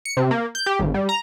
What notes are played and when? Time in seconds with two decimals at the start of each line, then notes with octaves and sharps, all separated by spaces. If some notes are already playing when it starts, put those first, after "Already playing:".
0.05 C#7
0.17 C3
0.31 A#3
0.55 G6
0.66 G4
0.79 G#1
0.94 G3
1.09 A#5